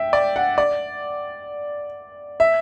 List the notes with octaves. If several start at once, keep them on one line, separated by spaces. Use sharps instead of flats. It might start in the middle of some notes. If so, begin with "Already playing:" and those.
Already playing: E5 G5
D5
F#5
D5
E5